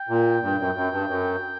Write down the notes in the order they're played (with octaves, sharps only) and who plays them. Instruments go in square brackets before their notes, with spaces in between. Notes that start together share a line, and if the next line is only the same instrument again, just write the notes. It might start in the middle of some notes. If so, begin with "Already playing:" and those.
Already playing: [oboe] G5
[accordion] A#2
G2
F#2
F#2
G2
F#2